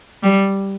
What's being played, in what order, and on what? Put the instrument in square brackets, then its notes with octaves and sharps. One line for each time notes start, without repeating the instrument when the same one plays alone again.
[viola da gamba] G3